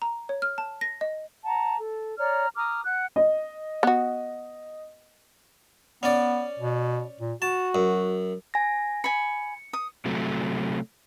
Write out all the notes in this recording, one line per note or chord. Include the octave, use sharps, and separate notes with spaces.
A#5
C#5
F6
A5
A#6
D#5
F#5 A5 A#5
A4
C#5 D5 A#5 F6
A#5 D6 D#6 F6
F#5 F#6
D#5
B3 F#4
B3 C#4 D5
B2
A#2
F#4 A5
F#2
G#5 A#6
G#5 B5 C#7
D#6
C3 F#3 A3